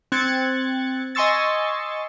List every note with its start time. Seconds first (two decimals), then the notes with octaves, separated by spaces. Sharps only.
0.12 C4 F#6 G#6 A6 C#7
1.15 D#5 G#5 C6 C#6 E6 A6